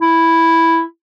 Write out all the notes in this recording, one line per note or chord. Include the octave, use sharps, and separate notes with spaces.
E4